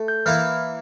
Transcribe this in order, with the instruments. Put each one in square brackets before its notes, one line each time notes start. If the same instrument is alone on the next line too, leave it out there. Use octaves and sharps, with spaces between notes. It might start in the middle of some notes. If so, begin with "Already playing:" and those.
Already playing: [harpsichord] A3
[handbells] G6
[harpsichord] E3 A#3 E4 [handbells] F6